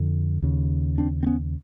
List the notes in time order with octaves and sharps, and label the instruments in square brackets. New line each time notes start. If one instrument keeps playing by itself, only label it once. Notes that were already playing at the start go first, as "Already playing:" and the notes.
Already playing: [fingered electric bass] F2 D3
D#2 C#3
C4 D4
C4
B3 C#4